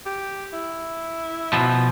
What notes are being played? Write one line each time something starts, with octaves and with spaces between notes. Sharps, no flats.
G4
E4
B2 F3